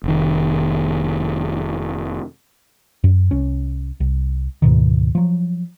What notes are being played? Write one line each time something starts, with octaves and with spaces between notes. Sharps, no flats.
F1 D#3
F#2
C2 C#4
C2
D2 G#2 B2 D#3
F3 F#3